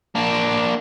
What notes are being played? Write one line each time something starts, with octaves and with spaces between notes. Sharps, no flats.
A#3 D4